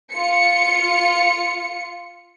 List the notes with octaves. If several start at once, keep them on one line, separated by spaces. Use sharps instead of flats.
F4 C#7